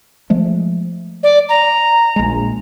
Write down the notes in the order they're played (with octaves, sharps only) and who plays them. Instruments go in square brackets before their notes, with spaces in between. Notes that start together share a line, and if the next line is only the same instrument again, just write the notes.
[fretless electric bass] F3 G#3 A3
[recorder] D5
A#5
[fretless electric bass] A#1 G#3